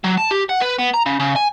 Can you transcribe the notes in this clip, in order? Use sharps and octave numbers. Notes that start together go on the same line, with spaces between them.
F#3
A5
G4
F#5
B4
B3
A#5
C#3
C#3
G#5